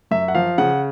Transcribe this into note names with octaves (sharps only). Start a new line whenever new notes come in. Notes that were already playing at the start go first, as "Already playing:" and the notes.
F#2 E5
F#5
F3 F5
C#3 F#5